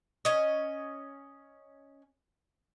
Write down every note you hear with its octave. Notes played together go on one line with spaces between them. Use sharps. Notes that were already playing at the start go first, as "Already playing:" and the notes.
C#4 D#5